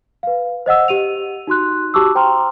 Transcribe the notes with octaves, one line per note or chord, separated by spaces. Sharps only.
B4 F5
C5 D#5 F#5 E6
G4 D#7 F7
D#4 F#4 C6 F#6
F#4 G4 A5 C#6 D6 E6
C5 G5 A#5 C6 F6